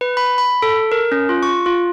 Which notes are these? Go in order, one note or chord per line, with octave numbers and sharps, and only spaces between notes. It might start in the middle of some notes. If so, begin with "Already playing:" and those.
B4
B5
B5
A4
A#4
C#4
F4
C#6
F4